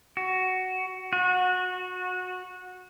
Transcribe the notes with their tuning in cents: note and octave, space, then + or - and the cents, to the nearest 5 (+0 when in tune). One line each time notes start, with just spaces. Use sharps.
F#4 +10
F#4 -20